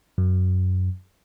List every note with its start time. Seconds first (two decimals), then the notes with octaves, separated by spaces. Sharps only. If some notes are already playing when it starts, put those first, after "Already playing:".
0.18 F#2